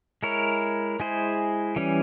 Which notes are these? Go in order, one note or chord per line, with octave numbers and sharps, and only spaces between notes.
G#3 E4 A#4 C#5
G#3 E4 G#4 C5
E3 G3 C#4